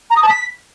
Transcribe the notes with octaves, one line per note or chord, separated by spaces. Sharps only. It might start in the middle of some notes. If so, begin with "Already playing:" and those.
A#5
D#6
A5
B6